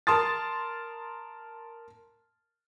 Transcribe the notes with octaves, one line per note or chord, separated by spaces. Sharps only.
A#4 A5 C6 D#6 A6